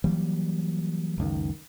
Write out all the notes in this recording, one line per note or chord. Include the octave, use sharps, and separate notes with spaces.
E3 F#3 G3 A#3
F#1 C#2 D#3